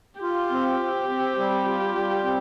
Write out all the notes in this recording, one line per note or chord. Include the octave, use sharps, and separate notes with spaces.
F4 G4
C4
C4
C4
G3
F4
G3
C4